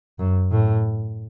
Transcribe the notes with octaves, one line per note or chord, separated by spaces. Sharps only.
F#2
A2